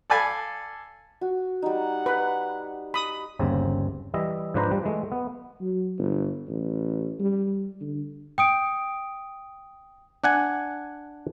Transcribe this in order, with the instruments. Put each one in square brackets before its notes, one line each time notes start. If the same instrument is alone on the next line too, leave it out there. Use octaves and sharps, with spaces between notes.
[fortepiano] A4 D5 F5 G#5 B5
[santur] F#4
[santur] G3 D#4 [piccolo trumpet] F#5
[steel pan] B4
B5 D#6
[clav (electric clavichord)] G1 D#2 C#3 C4
E3 G3 D#5 E5
G#2 F3 D4 B4 C5 A#5
G3
E3 G#3 A3
B3
[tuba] F#3
G1
A1
G3
D3
[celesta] G5 D#6 D7
[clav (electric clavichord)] D4 F#5 G#5